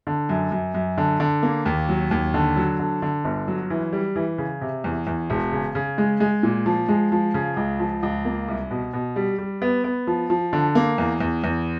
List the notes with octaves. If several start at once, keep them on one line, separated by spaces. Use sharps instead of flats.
D3
F#2
F#2
F#2
D3
D3
A#3
D#2
F#3
D#2
D3
F#3
D3
D3
G1
F#3
E3
G3
E3
C#3
C3
E2
E2
E1
C#3
C#3
G#3
G#3
A#2
F3
G#3
F3
C#3
C#2
F3
C#2
A#3
C2
B2
B2
G3
G3
B3
B3
F3
F3
D3
A#3
E2
E2
E2